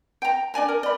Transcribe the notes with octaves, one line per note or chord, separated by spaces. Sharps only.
G5 A#5
D4 D5 G#5 A#5
A#4
D5 B5